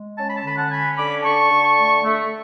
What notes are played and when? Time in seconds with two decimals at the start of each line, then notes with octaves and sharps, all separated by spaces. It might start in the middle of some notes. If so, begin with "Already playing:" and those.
Already playing: G#3
0.16 C#4 A5
0.28 B5
0.37 A5
0.44 D3 B5
0.57 F#5 A5
0.70 C#4 G#5 B5
0.97 D3 B5 D6
1.23 D3 A5 C#6
1.50 D3
1.78 A3
2.04 A3